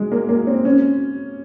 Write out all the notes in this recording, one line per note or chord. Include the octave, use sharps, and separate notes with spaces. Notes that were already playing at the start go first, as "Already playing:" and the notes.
Already playing: G#3
A#3
A#3
C4
C#4